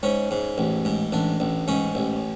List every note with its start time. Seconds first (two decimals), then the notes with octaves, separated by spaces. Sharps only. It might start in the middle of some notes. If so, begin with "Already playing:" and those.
0.03 G#2 C#4
0.31 G#2
0.58 A1
0.85 G#2
1.12 A1 D4
1.40 A1
1.68 G#2 C#4
1.95 A1